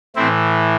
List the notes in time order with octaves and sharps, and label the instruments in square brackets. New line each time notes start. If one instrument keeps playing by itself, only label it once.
[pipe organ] A2 E3 C4 E4